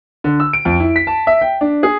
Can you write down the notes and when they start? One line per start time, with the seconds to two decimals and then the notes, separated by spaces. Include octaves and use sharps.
0.24 D3
0.40 E6
0.53 D7
0.65 F2
0.80 E4
0.96 B6
1.07 A5
1.27 E5
1.41 G5
1.61 D4
1.83 G#4